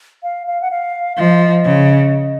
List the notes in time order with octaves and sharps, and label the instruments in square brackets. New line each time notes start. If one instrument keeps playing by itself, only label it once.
[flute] F5
F5
F#5
F5
[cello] F3 [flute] D#5 F5
[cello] C#3